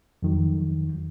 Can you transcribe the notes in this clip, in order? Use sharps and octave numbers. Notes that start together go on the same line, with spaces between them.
F2 D#3 F#3